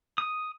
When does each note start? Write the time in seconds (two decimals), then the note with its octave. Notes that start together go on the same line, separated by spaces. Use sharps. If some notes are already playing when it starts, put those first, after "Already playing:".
0.18 D#6